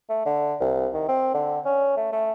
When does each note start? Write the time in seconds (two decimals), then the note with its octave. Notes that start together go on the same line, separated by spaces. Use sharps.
0.09 A3
0.26 D3
0.61 C2
0.93 D#3
1.08 C4
1.34 D3
1.65 C#4
1.97 A3
2.12 A3